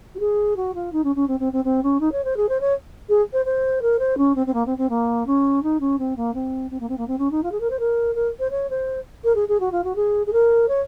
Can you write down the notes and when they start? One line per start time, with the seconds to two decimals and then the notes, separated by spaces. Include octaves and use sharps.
0.15 F#4
0.20 G#4
0.57 F#4
0.75 F4
0.93 D#4
1.04 C#4
1.16 C#4
1.28 C4
1.40 C4
1.53 C4
1.65 C4
1.83 C#4
2.00 D#4
2.12 C#5
2.24 C5
2.37 G#4
2.49 C5
2.61 C#5
3.09 G#4
3.33 C5
3.45 C5
3.82 A#4
3.99 C5
4.18 C#4
4.35 C4
4.47 C4
4.54 A#3
4.66 C4
4.78 C4
4.89 A#3
5.27 C#4
5.63 D#4
5.80 C#4
5.99 C4
6.17 A#3
6.34 C4
6.71 C4
6.80 A#3
6.89 C4
6.98 A#3
7.07 C4
7.18 C#4
7.31 D#4
7.43 F4
7.52 G#4
7.60 A#4
7.70 C5
7.79 A#4
8.15 A#4
8.40 C5
8.51 C#5
8.70 C5
9.24 A#4
9.35 G#4
9.48 G#4
9.60 F#4
9.72 F4
9.84 F#4
9.96 G#4
10.27 G#4
10.33 A#4
10.68 C#5